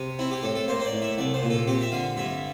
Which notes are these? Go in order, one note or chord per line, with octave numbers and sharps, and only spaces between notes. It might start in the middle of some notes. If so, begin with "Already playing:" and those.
Already playing: C3
C4 E4
G4
A2 A4
A4
A#3 C5
C5
D5
A2
E5
C2 D5
C5
A#2
A4
C4 G4
E5
D3 F5
G2 E5